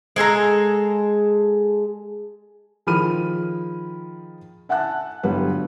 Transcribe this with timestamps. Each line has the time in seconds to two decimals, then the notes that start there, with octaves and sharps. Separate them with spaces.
0.16 G#3 G#4 A4 A#5
2.87 D#3 F3 G#4 B5 F6 D#7
4.69 E5 F#5 G#5 A5 F#6
5.23 G1 F#3 G3 B4